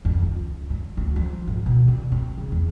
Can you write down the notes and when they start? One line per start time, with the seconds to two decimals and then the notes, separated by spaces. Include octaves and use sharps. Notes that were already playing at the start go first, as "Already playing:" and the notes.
0.05 F2
0.23 C#2
0.70 F#3
0.97 D2
1.16 F3
1.47 G#2
1.66 B2
1.88 D3
2.12 C4
2.38 C#3
2.52 E2